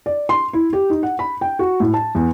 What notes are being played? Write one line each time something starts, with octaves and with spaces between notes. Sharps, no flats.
D5
C6
E4
G4
D#4
F#5
B5
G5
F#4
A2
A5
E2